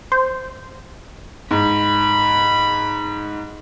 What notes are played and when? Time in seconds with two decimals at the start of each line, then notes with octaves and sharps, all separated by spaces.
0.12 C5
1.51 G#2 B5